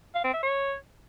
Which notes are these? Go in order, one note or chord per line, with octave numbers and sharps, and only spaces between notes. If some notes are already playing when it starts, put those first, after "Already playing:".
F5
C4
E5
C#5